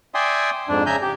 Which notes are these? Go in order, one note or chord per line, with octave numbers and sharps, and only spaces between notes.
D5 E5 G5 G#5 C6 D#6
F2 G#2 D4
C#3 E5 G#5 A#5 G6
G4